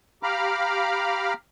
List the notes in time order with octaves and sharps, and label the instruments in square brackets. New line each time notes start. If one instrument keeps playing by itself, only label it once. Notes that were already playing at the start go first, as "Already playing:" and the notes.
[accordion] G4 F5 A#5 B5 D6 F6